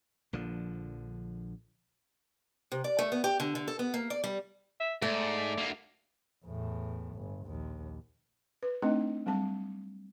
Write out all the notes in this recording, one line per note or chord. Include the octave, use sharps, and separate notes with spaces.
A#1 D3 F3
C3
D5
A3
B3
G4
D3
D3
A4
B3
A#3
D5
G3
E5
G#2 A3 D5
D2 A#3
E2 A2
G1
A#1 D#2
B4
A3 C4 D4 D#4 D#5 G5
F#3 G3 C4 A5